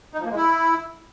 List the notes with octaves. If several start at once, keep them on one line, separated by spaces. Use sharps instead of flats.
D#4
F3
A#3
G#3
E4